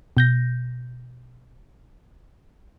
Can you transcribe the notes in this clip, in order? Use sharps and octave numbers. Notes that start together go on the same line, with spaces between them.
B2 G6 A#6